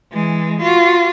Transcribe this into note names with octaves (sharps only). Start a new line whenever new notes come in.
E3 G#3
F4 F#4